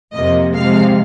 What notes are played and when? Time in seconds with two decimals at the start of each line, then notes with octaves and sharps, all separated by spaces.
0.13 F2 C3 F3 A#3 D#5
0.54 C3 F3 G#3 F5